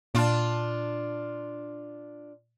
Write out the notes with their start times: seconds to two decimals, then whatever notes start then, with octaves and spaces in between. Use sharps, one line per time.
0.15 A#2 D4 F4 A5